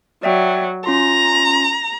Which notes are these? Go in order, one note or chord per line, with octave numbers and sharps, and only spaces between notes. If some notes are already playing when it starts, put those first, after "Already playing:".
F#3 D5 E5 G5
C#4 F4 A#5 C6